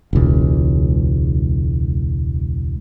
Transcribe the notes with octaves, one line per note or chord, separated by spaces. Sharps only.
E1 C#2